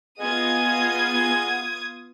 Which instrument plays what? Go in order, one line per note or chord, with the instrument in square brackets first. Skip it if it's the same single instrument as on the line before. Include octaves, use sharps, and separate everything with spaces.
[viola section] B3 F4 [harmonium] G#4 D#5 F#5 [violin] D#6 G#6